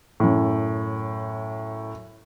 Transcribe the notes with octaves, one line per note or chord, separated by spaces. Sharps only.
F#2 A2